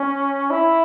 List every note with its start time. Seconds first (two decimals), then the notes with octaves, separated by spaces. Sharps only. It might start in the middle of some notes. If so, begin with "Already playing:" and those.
Already playing: C#4
0.51 E4